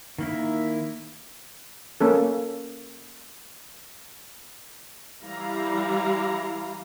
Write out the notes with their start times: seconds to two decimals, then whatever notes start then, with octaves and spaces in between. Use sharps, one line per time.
0.19 D#3 A#3 E4
2.01 A#3 C#4 A4
5.23 E3 G3 E4 F5 A#5